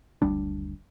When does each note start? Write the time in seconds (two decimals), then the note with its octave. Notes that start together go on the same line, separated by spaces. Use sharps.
0.22 F#1 D2 G3 D4